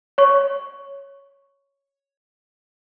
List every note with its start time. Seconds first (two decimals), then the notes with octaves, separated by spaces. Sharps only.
0.18 C#5 C#6